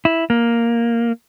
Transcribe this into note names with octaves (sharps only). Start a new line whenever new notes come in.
E4
A#3